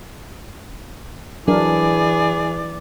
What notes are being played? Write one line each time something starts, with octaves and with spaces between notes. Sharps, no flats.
E3 F#3 D4 G#4 A#4 D5 D6